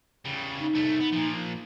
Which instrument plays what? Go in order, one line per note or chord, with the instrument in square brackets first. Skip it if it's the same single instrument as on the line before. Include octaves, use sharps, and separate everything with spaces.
[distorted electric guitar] C#3 G3
[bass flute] D#4
[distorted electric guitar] C2 A3
B3
A#2 F3